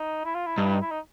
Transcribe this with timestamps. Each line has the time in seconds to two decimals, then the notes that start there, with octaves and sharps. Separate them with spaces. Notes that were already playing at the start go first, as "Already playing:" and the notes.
Already playing: D#4
0.25 E4
0.35 F4
0.46 E4
0.57 G2 D#4
0.66 E4
0.74 D#4
0.81 E4
0.91 D#4